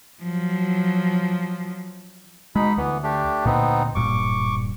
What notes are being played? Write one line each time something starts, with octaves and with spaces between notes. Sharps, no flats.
F3 F#3
B2 G#3 D#4 B5
D2 E3 B3
A3 D4 G4
D2 A#2 B3 C4 D#4
D1 G2 A#2 C#6 D6